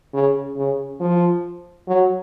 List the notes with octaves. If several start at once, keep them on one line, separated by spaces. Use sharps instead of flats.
C#3
C#3
F3
F#3